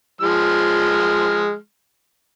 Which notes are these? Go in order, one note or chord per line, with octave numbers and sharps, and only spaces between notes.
F3 G#3 F6